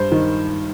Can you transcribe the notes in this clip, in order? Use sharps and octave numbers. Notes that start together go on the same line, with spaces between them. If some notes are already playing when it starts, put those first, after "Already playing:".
Already playing: G2 C5
D#3